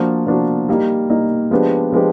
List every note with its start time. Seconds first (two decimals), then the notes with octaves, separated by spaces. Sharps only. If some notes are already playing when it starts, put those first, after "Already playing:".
Already playing: F3 A#3 D4 F#4
0.27 F3 A#3 D4 F#4
0.69 G3 A#3 D#4
1.10 G3 A#3 D#4
1.51 F3 G#3 B3 D4 G4
1.92 F3 G#3 B3 D4 G4